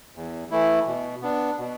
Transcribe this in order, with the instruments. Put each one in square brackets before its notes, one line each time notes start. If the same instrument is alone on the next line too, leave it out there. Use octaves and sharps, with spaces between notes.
[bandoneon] E2
E3 A3 E4
B2
B3 D4
B2